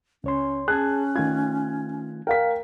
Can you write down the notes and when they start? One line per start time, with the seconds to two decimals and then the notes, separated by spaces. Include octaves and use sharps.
0.24 C#2 C#4 C#5 C6
0.68 C#4 G#4 A5 F#6 G#6
1.16 D#3 A3 F4 G#6
2.27 A#4 F5 G5 B6